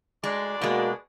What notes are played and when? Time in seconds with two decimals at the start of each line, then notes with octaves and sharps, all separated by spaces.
0.24 D2 G#3 D4 D5
0.62 B2 G#3 A#3 F#4